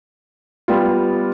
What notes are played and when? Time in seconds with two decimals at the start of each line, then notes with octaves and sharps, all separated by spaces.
0.68 G3 B3 F4